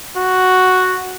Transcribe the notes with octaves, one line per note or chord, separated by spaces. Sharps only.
F#4